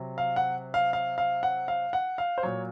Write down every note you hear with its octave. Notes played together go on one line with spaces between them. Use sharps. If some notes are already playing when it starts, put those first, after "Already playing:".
Already playing: C3 F#3
F5
F#5
F5
F5
F5
F#5
F5
F#5
F5
C5
A#2 F#3 C#5